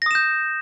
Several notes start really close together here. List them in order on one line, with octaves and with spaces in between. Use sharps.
A#6 D#6 E7 G6